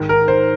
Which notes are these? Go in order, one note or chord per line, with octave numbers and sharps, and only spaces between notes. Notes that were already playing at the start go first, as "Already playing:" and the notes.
Already playing: G#2 D#3
A#4
C5